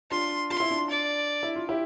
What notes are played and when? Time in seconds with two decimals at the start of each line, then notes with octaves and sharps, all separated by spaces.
0.11 D4 F4 C6
0.50 F4 C6
0.60 E4
0.70 D4 F4
0.90 D5
1.43 E4
1.56 F4
1.69 E4 G4